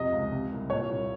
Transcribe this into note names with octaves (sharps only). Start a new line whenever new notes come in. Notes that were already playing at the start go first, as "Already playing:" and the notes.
Already playing: F2 C3 D#5
C#2
C3
C2
A#2 C#5
C2